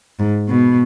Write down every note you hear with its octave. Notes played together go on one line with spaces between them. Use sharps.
G#2
B2